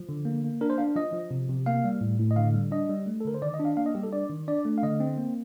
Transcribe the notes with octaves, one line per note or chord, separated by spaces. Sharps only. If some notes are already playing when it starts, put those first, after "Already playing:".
Already playing: F3
D3
A#3
A#3
D4 A#4
C5
D4 F5
F3 D#5
F3
C3
C3
A#3 F5
G3
A2
A2
D#5
D3 F5
G3
D4 D#5
G3
A3
A4
D3 A#4
C5
D#3 D5
D#5
D4
F5
A#3 F5
D#5
G3 G4
A4
D4 D5
D#3
D4 D5
A3
F5
D3 D#5
C4
A#3